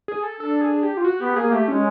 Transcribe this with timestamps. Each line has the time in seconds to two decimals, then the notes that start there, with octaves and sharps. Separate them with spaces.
0.08 G#4
0.23 A4
0.40 D4 A4
0.61 G#4
0.83 G4
0.97 F4
1.04 F#4
1.20 B3 G4
1.36 A#3 G#4
1.52 A3 G4
1.68 G#3 C#4